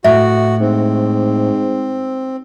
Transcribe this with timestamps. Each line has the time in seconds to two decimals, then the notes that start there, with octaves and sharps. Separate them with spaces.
0.04 A2 F#4 E5
0.61 G#2 C4